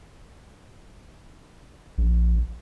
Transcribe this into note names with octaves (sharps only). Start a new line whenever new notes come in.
A#1